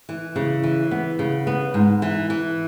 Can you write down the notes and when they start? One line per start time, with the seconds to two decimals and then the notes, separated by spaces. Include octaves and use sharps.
0.09 E3
0.36 C#3
0.63 E3
0.91 B3
1.19 C#3
1.47 B3
1.74 G#2
2.02 E3
2.30 E3